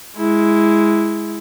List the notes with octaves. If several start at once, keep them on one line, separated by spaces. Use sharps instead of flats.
G#3 E4